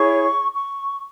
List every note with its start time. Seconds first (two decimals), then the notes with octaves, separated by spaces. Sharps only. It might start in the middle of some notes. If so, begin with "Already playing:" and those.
Already playing: E4 G#4 C#5 C#6
0.55 C#6